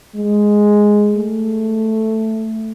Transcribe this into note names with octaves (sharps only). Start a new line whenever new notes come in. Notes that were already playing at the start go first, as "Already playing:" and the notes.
G#3
A3